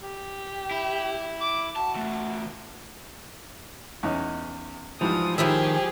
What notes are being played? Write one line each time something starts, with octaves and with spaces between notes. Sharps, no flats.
G4
E4
D6
F#4 A5
E2 A3
E2 C#4 D#4
G#2 E3 F3 G3 D#6
D#3 F3 E4 G4 G#4 E5